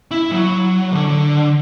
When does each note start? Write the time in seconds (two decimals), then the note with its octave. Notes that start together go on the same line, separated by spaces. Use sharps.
0.11 E4
0.31 F#3
0.91 D3